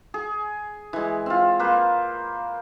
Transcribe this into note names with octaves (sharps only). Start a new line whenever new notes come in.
G#4
E3 G#3
C4 F4
A#3 B4 C5